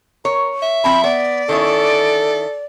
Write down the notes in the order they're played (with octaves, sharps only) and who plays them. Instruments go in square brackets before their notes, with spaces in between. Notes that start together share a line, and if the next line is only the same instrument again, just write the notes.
[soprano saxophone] A#4 [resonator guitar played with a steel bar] C#5
[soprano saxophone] E5
[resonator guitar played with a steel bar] F3 C4 A5 [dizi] B5
[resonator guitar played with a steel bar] B3 [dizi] D5
[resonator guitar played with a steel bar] D#3 C#4 E4 [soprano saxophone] A4